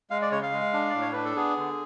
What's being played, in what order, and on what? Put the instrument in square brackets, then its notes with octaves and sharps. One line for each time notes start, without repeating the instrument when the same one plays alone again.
[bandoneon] G#3 F5
D5
C#3 C#5
F5
G#3
D4
A2 D5
C#5
D4 B4
A4
B3 G#4
D3